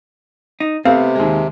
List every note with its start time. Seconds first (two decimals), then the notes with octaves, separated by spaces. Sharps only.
0.60 D#4
0.85 C3 A3 B3 C4 F5
1.15 D#2 G#3